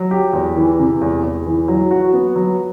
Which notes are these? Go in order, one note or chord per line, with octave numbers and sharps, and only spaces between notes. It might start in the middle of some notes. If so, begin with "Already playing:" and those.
Already playing: F#3
G4
E2
E3
C3
E2
E2
E3
F#3
F#4
B3
F#3